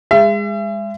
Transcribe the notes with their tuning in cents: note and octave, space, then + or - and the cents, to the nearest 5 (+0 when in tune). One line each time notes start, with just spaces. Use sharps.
G#3 -20 E5 +35